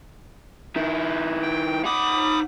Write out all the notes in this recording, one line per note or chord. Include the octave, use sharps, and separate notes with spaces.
D#3 E4
G5
D#4 F#5 B5 D6 D#6